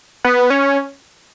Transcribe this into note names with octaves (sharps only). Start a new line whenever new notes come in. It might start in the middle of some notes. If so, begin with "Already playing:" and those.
B3
C#4